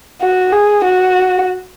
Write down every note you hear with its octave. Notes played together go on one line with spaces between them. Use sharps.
F#4
G#4
F#4